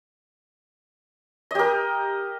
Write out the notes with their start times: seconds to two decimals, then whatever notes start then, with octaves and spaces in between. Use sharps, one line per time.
1.51 D#5
1.55 G4
1.59 A#4